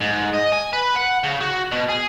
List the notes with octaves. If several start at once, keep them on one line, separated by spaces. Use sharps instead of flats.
G#2
D#5
G#5
B4
F#5
C#3
F#4
B2
G#4